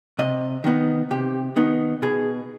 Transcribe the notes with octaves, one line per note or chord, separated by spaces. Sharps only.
C3 D#5
D#3 B3 D#4
C3 G4
D#3 B3 D#4
B2 G#4